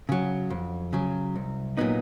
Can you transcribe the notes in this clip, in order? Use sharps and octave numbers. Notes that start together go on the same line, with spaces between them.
C#3 F#3
F2
C#3 F#3
C2
A#2 F#3 B3 D#4